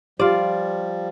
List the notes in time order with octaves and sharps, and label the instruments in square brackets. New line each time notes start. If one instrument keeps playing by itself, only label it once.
[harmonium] F3 G3 [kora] F4 D5 [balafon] G4